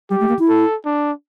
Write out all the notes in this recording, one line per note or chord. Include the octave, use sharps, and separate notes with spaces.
G3 G4
A3
A#3
E4
A4
D4